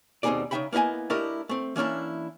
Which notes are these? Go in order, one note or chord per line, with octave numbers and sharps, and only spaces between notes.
D#2 B2 C4 D#4 G#4 D5
C#3 A3 D#4 E5 G5 B5
A#3 B3 E4 D#5 G#5
A3 D4 E4 G4 A#4 D#5
A3 C4
E3 A#3 C#4 D4 E4